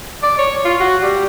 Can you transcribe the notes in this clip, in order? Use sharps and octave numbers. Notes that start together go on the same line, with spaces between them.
D5
C#5
F4
F#4
G3